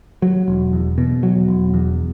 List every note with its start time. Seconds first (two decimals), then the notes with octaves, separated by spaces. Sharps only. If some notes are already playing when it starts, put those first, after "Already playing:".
0.22 F#3
0.48 E1
0.73 E2
0.98 B2
1.23 F#3
1.48 E1
1.74 E2